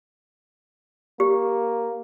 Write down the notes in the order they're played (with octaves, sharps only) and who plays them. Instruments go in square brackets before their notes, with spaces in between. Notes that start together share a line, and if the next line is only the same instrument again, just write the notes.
[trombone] A#3 [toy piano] G4